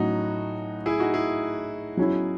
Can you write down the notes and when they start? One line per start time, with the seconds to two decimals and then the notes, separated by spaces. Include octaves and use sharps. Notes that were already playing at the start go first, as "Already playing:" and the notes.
Already playing: A2 F#3 C#4 D#4 F#4
0.86 E4 G#4
1.00 D#4 F#4
1.14 E4 G#4
1.97 F#3 C#4 E4